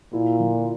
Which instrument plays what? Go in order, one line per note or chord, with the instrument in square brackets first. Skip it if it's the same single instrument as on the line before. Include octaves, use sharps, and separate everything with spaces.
[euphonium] A#2 [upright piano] E4
[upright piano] D3